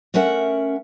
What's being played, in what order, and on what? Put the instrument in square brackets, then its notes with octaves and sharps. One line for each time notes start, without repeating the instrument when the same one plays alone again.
[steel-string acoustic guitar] A3 C#4 A#4 E5 F#5